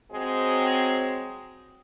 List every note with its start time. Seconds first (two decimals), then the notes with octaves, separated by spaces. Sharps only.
0.12 F#3 G#3 C4